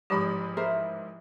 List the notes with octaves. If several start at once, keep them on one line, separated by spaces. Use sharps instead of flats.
A1 G#2 F3 G4 B5
A#4 C5 E5